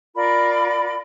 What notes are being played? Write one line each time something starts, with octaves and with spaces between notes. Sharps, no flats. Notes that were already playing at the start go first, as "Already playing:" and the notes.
F4 A#4 D5 B5